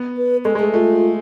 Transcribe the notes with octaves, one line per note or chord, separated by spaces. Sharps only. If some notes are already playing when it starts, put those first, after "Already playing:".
Already playing: B3
B4
G#3 A4
G#3
A3 G#4
A3 F4